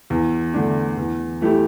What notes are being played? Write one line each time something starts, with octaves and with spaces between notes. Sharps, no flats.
E2
D3 A3 D4
E2
E3 A3 E4 G4